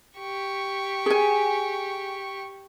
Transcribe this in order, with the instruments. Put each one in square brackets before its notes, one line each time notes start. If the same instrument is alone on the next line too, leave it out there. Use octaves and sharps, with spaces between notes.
[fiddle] G4 C#6
[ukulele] G#4 G#5